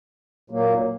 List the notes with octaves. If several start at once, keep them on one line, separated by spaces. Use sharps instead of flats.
A#2 F#3 A#3